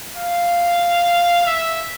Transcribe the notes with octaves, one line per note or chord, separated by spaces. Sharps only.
F5
E5